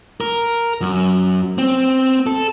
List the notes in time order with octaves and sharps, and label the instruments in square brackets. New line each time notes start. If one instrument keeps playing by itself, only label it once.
[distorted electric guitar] A#4
F#2
C4
A4